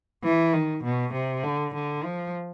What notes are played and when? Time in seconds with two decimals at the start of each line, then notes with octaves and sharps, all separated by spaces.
0.23 E3
0.53 D#3
0.84 B2
1.13 C3
1.43 D3
1.74 D3
2.04 F3